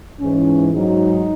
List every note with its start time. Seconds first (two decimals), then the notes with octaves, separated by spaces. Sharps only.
0.19 G#2 E3 C#4
0.73 G#2 F#3 D#4